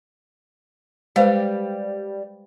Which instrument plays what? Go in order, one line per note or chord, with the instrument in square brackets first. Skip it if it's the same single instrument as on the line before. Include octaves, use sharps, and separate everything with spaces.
[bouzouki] G3 [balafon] G#3 [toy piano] B4 C5 F5